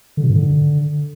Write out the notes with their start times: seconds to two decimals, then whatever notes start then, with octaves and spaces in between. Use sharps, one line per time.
0.17 D3
0.23 B2
0.30 G#2
0.36 D3